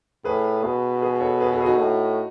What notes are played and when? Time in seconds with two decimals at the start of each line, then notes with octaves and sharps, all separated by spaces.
0.25 A2 G#4 B4
0.63 B2 G#4 B4
1.01 G#4 B4
1.20 A4 C#5
1.40 G#4 B4
1.52 F#4 A4
1.61 G#4
1.65 D#4 F#4
1.78 A2